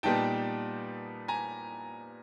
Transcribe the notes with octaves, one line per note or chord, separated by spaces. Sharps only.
A#2 G3 B3 D#4 G5 A5
G#5 A#5